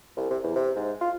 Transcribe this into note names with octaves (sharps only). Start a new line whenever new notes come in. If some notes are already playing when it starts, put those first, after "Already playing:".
C2
C3
E2
C3
G#2
F4